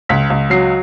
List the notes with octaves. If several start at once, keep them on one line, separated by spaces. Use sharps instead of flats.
C#2 B6
C#2
F#3 C7